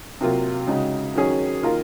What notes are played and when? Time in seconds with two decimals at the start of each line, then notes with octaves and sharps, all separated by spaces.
0.21 C3 F#3 A#3 F4
0.67 C#3 G#3 D#4 F#4
1.15 D#3 F#3 C#4 G#4
1.62 D#3 A#3 F4 A#4